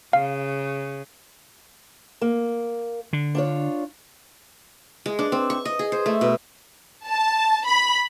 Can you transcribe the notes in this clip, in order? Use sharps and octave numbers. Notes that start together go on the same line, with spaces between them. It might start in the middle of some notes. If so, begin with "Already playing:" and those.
C#3 F5
A#3
D3
D4 F4 C#5
G#3
D4
C4
C#6
D#5
G#4
C5
A3
B2
A5
B5